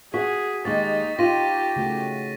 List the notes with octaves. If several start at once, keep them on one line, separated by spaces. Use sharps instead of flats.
F#4 G#4 B6
D#2 G#3 D#4 G4 C#6 A6
D#4 F4 G4 A#6 D#7
C#3 A3 F#4